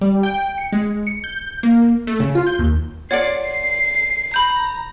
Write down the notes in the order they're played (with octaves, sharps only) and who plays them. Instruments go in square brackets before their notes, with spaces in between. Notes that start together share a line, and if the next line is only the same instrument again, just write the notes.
[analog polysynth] G3
G5
C#7
G#3
C#7
G6
A#3
A3
C#3
F4
G6
D#2
[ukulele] F4 D5 [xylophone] C#5 F#5 [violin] C7
[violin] A#5 [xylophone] B5 G6